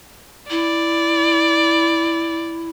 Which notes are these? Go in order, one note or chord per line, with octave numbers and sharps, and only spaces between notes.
E4 D5